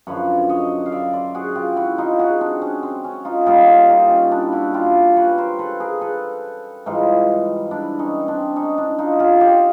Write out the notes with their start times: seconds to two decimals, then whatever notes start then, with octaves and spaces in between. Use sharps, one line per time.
0.07 F#2 D3 F3 B4 C#5
0.49 C#5 D#5
0.86 F5
0.92 D5 E5
1.13 C5 D5
1.35 F#4 G#4
1.56 F4 G4
1.76 E4 F#4
1.98 D#4 F4
2.19 F#4 G#4
2.41 C4 D4
2.62 C#4
2.83 C4
3.04 C#4
3.25 D#4 F4
3.46 A#2 G3 D#4 F4
3.68 F4 G4
3.89 D#4 F4
4.10 C#4
4.31 D4 E4
4.53 E4 F#4
4.74 F4 G4
5.16 B4 C#5
5.38 A#4 C5
5.59 A4 B4
5.80 G#4 A#4
6.01 A4 B4
6.86 G#2 E3 G3 D#4 F4
7.71 D4 E4
7.99 C#4 D#4
8.28 C4 D4
8.56 C#4 D#4
8.78 D4 E4
8.99 D#4 F4
9.20 F4 G4
9.41 F4 G4